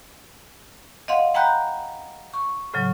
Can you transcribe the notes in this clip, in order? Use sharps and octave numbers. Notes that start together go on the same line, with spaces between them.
D#5 F5 F#5 C6
F#5 G5 A#5 B5 F#6 G6
C#6
A2 C#3 F#3